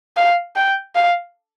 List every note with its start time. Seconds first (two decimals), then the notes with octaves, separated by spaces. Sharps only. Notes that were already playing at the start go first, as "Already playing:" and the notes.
0.17 F5
0.56 G5
0.95 F5